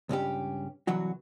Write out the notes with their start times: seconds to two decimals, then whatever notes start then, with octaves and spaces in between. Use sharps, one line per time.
0.09 C#2 G2 C#4 G4
0.87 C2 E3 F#3 F#4